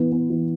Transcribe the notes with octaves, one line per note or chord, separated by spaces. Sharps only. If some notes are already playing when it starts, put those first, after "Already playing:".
Already playing: E3 B3
B3
E3